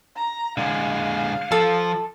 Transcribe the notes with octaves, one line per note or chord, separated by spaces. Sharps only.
A#5
D3 G#3 F5
F3 A4